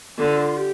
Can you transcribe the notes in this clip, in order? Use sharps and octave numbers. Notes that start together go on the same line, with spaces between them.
D3 F4
G4